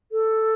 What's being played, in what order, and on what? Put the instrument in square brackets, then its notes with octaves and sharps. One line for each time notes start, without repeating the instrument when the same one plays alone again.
[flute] A4